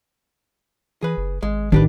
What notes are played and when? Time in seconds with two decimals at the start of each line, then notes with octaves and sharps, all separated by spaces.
1.02 E3 G#4 B4
1.17 F#1
1.43 G#1 G#3
1.72 A1 D#3 D4 G4 B4